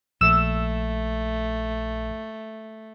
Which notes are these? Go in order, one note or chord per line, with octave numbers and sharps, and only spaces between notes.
A#1 A3 E6 E7